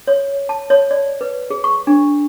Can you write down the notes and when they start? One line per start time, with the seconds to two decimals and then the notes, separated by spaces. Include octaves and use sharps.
0.08 C#5
0.49 A5
0.70 C#5
0.91 D5
1.21 B4
1.50 G#4
1.64 C#6
1.87 D4